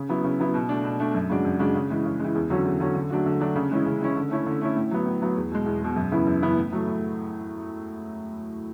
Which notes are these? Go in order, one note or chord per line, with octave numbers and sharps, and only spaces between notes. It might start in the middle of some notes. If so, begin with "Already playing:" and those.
Already playing: C#3
F#3 B3 E4
C#3
F#3 B3 E4
B2
A3 D4
B2
A3 D4
F#2
C#3 G#3 D4 F#4
F#2
C#3 G#3 D4 F#4
C#3
E3 G#3
C#3
E3 G#3
E2
D3 F#3 C#4 F#4
E2
D3 F#3 C#4 F#4
D3
F#3 A3 D4 F#4
D3
F#3 A3 D4 F#4
C#3
E3 G#3 C#4 E4
C#3
E3 G#3 C#4 E4
D3
A3 C#4 E4
D3
A3 C#4 E4
A2
F#3 B3
A2
F#3 B3
E2
B2 G#3
E2
B2 G#3
F#2
C#3 E3 B3 E4
F#2
C#3 E3 B3 E4
A2
F#3 A3
A2